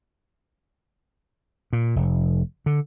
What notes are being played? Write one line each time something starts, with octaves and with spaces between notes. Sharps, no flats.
A#2
F1
D3